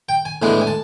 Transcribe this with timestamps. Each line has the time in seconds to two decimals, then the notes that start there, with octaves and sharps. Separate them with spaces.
0.09 G5
0.25 G#5
0.42 A2 E3 G#3 B3 D4 G#5
0.61 G#5
0.67 A5